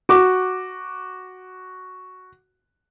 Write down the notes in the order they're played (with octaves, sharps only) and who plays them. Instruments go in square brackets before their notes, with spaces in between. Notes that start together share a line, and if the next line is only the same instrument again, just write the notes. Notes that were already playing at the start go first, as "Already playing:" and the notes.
[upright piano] F#4 D6